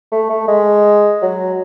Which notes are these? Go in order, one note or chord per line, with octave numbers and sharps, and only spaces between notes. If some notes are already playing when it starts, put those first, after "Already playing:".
A3
A3
G#3
F#3